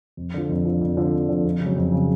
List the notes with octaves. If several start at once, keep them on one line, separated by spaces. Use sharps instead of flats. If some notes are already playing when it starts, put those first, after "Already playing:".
F2
D3 F3
F2
D3 F3
F2
D3 F3
F2
D3 F3
F2
C#3
F#3
F2
C#3 F#3